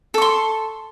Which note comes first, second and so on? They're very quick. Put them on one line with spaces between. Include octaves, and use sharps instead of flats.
A4 C#6 C6